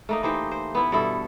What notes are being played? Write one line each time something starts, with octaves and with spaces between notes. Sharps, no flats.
A3 A#3 D#4
E3 D#4 G4 C5
C5
B3 E4
G2 B2 E4 A4